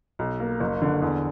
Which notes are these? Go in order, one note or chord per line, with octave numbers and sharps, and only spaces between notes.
B1
A#3
F#1
D3
E2